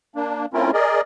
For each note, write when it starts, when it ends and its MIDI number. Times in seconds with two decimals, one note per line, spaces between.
0.16 0.46 58
0.16 0.46 62
0.54 0.71 57
0.54 0.71 60
0.54 0.71 61
0.54 0.71 64
0.54 0.71 65
0.54 0.71 70
0.73 1.01 68
0.73 1.01 70
0.73 1.01 74
0.73 1.01 75